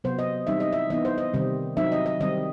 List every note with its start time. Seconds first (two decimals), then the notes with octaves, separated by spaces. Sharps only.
0.04 C3 F#3 B3 C5
0.19 D#5
0.47 E3 G3 C4 D#4 E5
0.60 D#5
0.73 E5
0.90 E3 B3 D#4 D#5
1.05 C5
1.18 D#5
1.34 C3 D#3 G3 C4
1.77 F#3 C4 D#4 E5
1.92 D#5
2.06 D#5
2.20 D#3 G3 C4 D#5